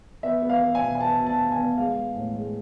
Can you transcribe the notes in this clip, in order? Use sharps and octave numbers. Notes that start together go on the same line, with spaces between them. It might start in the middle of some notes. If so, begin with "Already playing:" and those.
B3 E5
B3
F5
B3
G#5
B2
G#5
B3 A5
B2
A5
B2
G#5
B3
G#3 F5
G#3
A2
G#3